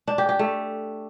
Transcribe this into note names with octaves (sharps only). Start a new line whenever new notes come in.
D4
G4
G4
A3